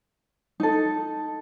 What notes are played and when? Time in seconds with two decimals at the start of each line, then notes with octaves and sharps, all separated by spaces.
0.60 D#4 A4